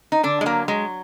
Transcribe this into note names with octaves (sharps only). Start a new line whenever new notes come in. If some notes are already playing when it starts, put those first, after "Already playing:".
D#4
D3 D4
G#3
F#3 A#3
F#3 G#3